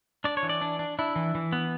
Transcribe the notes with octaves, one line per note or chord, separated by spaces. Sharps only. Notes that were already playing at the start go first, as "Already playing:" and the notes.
D4 D5
C#5
E3
D5
D4
D4
D4 E4
E3
E3
B3